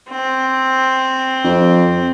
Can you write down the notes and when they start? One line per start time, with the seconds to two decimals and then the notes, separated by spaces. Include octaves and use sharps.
0.10 C4
1.44 F2